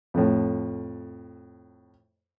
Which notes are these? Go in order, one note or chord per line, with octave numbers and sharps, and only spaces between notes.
F2 A2